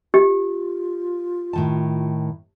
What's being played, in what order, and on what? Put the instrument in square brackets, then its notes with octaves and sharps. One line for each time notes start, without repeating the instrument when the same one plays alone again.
[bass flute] F4 [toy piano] G4
[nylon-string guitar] A2 D#3 A5